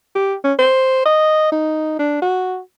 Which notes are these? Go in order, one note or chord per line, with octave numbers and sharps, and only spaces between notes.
G4
C#4
C5
D#5
D#4
D4
F#4